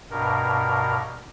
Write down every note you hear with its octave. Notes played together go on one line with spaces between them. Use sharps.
G2 B2 A#4